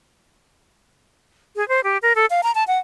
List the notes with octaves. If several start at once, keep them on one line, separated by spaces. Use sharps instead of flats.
G#4
C5
G4
A#4
A4
F5
A#5
A5
F#5